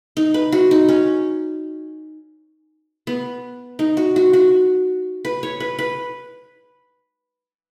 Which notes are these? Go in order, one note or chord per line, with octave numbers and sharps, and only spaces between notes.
D#4
B4
F#4
D#4
C#4
B3
D#4
F#4
F#4
F#4
B4
C#5
B4
B4